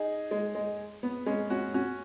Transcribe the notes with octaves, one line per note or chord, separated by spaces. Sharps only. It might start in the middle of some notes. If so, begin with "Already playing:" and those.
Already playing: D#4 G#4
G#3
G#3
B3
G#3 C#4
C#4 F#4
C#4 F#4